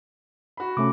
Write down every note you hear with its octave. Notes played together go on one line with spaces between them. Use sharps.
F#4 B5
C3 A3 C#4 D6